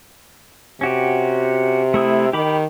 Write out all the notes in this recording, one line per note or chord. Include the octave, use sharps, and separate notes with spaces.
C3 C#4 F#4 G4
A3 E4 D#6
D#3 G4 B5 D6